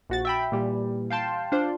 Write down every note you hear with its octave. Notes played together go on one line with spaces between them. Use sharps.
A#1 F#4 A6
E5 G5 B5
A#2 E3 G3
F5 G5 A5 C6
D4 F4 C5